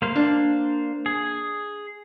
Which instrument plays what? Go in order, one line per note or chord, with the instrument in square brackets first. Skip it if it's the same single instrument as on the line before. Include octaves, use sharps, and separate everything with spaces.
[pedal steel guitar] A#3 C5 F5
[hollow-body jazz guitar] D4
[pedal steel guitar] G#4